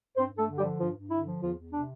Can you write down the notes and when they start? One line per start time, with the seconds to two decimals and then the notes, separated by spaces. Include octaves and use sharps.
0.17 G2 C4 C5
0.32 G2
0.38 A3 A4
0.48 D3
0.58 G3 G4
0.64 F3
0.80 G2 F3 F4
0.96 G2
1.10 D3 E4
1.26 F3
1.42 E2 F3 F4
1.57 E2
1.72 C3 D4